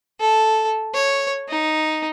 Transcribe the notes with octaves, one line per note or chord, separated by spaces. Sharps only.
A4
C#5
D#4